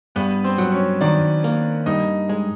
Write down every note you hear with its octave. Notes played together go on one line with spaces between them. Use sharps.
G2 B3 B4
C4 C5
F#3
C#4 C#5
D#3 D4 D5
A#3
G2 D#4 D#5
G#3